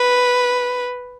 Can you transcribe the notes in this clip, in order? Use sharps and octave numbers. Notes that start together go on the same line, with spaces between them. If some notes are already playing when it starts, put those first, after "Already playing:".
Already playing: B4